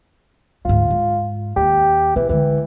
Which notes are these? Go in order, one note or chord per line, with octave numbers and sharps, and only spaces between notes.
D2 G#2 F4
G#2
D#2 G4
B1 E3
D3 E3 G#3